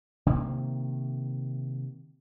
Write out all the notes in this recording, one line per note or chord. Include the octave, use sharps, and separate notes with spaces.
C3 D#3 A#3